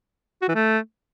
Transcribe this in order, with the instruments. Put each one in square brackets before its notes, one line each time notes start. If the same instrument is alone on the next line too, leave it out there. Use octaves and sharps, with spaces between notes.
[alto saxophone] F#4
E3
A3